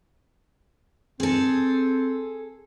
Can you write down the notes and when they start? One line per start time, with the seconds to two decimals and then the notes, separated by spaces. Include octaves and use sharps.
1.20 C4 G#4 A4